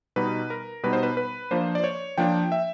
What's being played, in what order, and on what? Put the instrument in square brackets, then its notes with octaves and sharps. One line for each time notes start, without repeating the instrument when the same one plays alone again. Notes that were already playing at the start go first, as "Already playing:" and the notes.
[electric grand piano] B2 G3 B3 D#4 B4
A#4
B2 G3 B3 D#4 B4
C5
B4
B4
F3 A#3 D4 C5
D5
C#5
F3 A#3 D4 G5
E5